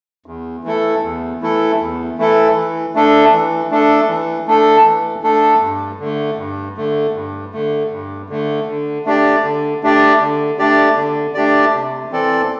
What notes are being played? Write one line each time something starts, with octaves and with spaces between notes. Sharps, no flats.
E2
E3 A3 E4 A4
E2
E3 A3 E4 A4
E2
E3 A3 E4 A4
E3
A3 D4 A4
E3
A3 D4 A4
E3
A3 D4 A4
E3
A3 D4 A4
G2
D3 A3
G2
D3 A3
G2
D3 A3
G2
D3 A3
D3
A3 D4 G4 D5
D3
A3 D4 G4 D5
D3
A3 D4 G4 D5
D3
A3 D4 G4 D5
C3
E3 C4 A4 D5